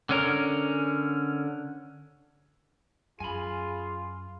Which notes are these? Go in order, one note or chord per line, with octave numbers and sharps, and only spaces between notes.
D3 C#4 A#4
F#2 F4 G#4 G#5 B5